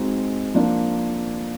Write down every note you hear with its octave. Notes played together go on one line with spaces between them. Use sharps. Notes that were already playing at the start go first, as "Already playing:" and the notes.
Already playing: G#3 C4 D#4 F#4
F3 A#3 D4